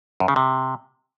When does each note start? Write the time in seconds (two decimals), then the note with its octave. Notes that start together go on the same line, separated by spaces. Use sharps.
0.20 F#2
0.28 C#3
0.36 C3